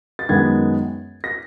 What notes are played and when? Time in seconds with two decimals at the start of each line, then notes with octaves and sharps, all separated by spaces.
0.19 A6
0.29 F#2 D#3 G#3 B3 G#6
1.24 A#6